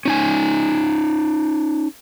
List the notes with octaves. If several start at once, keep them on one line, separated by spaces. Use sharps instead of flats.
C#4 D#4 G#5